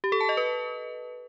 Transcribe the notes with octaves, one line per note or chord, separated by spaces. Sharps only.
G4
A4
A5
D#5
B4